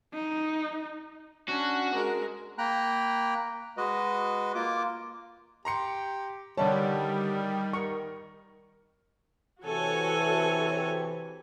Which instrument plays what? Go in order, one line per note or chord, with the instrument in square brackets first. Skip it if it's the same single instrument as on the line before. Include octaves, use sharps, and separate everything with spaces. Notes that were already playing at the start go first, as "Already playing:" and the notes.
[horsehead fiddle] D#4
[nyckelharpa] C#4 D4 [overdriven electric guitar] F#4
[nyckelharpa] G#3 A#4
[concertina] A#3 G5 A#5 B5 F#6
G#3 F#4 B4 D#5
A#3 F4 D6
[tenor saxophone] G4 [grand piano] A#5 C6 C#7
[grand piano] D3 D4 A5 [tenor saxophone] D#3 [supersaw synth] G3 [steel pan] C#5
[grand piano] A#4 [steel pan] C#6
[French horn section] C3 E3 [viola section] F#4 A4 C#5 [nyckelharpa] G#5